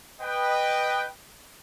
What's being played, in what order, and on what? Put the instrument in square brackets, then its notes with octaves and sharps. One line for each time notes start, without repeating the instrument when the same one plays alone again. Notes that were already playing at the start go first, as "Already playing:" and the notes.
[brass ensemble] B4 D#5 G5